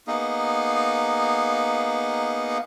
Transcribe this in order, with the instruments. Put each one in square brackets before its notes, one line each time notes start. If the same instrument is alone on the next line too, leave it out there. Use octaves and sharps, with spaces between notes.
[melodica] A#3 B3 D#4 G#4